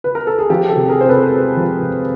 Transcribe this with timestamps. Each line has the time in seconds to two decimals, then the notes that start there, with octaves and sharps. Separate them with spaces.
0.04 B4
0.15 A#4
0.27 A4
0.39 G#4
0.50 F3 F4 G4
0.69 G4 A4
0.76 C3
0.89 G#4 A#4
1.01 C3 C5
1.09 A4 B4
1.30 G#3
1.57 F3
1.82 C3